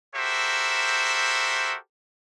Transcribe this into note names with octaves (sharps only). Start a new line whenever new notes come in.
F#4 G4 A4 A#4 C5 E5